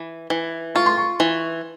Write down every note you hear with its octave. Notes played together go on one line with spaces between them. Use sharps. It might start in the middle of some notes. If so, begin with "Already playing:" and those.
Already playing: E3
E3
F4 C#6
C6
C#6
E3